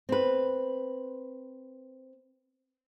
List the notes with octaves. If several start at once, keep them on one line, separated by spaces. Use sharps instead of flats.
C4 B4